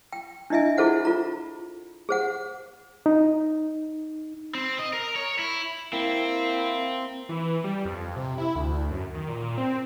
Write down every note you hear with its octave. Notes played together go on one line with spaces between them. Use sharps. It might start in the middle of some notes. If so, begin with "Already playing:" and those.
G5
D4 E4 D#5 E5 G#5
E4 F4 G#4 A4 C5 F#5
F4 A#5
G#4 C5 F#5
D#4
C4
D#5
A#4
C#5
E4
A#3 C4 E4
E3
G3
F2
C3
E4
D2
F#2
D#3
A#2
C4